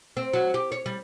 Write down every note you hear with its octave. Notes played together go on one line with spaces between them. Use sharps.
C4
F#3
G4
C#5
G3